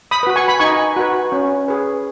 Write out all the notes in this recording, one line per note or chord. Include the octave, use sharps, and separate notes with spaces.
B5 D#6
F#4 B4
G#5 C#6
B5
D#4 G#5 C#6
F#4 B4
C#4
G#4 B4